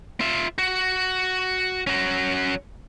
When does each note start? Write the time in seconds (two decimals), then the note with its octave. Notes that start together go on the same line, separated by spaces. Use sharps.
0.21 F4 E5
0.58 F#4
1.87 C#4 F#4